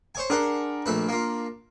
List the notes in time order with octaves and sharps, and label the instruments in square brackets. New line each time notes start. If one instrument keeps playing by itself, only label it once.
[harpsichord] C5 C#5 G#5
[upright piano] D4 A#4 [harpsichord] G#4 F#5 C6
[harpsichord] A#1 A3 B4
A#3 F4